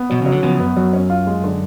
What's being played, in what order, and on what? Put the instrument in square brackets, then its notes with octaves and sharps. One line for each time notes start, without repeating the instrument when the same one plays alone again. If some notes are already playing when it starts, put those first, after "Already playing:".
Already playing: [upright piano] B3
[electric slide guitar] B2 [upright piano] F#3
[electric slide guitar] C#3 [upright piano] F#3
[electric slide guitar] D3
[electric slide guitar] C#3 F3 [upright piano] B3
[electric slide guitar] F#2 [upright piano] B3
[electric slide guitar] F#2 [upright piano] F#3
[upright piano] C#4
F4
G#3
D3